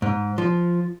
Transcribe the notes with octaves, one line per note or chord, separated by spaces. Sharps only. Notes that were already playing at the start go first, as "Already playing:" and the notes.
G#2
F3